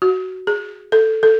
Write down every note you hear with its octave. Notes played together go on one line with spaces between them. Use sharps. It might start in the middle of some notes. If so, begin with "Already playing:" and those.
F#4
G#4
A4
A4